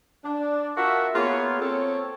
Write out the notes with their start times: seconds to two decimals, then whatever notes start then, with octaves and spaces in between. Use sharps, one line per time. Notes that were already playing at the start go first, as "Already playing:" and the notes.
0.24 D4
0.76 D4 F4 F#4 A#4 E5
1.14 A#3 B3 F4 G#4 B4 C#5
1.60 C4 A4 C#5